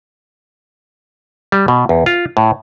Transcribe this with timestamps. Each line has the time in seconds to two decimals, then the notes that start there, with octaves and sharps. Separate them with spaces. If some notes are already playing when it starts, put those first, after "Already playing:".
1.52 G3
1.68 B2
1.89 E2
2.06 F4
2.37 A2